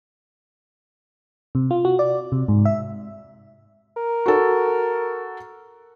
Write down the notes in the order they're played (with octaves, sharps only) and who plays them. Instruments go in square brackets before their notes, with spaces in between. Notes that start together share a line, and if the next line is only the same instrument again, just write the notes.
[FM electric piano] C3
F4
F#4
D5
C3
G#2
E5
[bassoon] A#4
[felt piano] F#4 A4